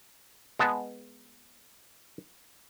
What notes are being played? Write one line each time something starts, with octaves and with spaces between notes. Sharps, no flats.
G#3 B3 A5